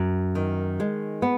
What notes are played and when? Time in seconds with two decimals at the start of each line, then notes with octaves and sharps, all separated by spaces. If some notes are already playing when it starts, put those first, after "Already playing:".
Already playing: F#2
0.35 D#3
0.80 G#3
1.22 B3